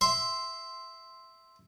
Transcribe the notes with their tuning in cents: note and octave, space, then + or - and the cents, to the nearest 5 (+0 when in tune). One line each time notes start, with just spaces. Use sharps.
E5 +0 C6 +0